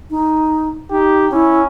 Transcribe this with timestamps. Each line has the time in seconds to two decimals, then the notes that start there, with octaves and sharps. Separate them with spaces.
0.11 D#4
0.91 D#4 G4
1.32 C#4 E4